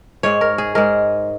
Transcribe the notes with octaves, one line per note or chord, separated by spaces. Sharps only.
G#2 G#3 C#5
A#4
G#4
G#2 G#3 A#4